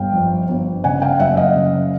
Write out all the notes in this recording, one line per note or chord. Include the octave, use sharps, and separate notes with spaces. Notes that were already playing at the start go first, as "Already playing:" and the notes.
Already playing: G1 F5 G5
F2
G1
C#3 F#5 G#5
F5 G5
F#1 E5 F#5
D#5 F5
C#3